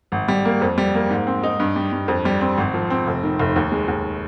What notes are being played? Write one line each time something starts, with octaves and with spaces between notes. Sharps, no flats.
G#1
G3
A#3
F2
G3
A#3
G#2
C4
D#4
G2
G3
G2
F2
G3
C4
G#1
F3
C4
F1
D#3
F1
D#2
G#3
D#2